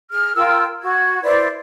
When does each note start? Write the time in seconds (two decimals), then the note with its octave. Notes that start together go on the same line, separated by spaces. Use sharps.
0.11 G#4 F6
0.35 F4 A#4 G5 E6
0.81 F#4 G#6
1.23 E4 B4 C5 D5